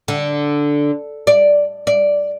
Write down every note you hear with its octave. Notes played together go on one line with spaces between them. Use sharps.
D3
D5
D5